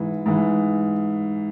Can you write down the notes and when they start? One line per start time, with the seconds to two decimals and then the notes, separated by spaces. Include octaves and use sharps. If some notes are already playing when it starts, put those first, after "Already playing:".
Already playing: G#2 E3
0.26 G#2 E3